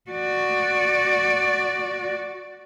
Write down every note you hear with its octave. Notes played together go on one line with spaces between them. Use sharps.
F#4 D5